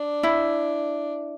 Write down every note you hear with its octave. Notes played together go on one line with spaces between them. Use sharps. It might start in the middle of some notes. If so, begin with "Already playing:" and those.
Already playing: D4
E4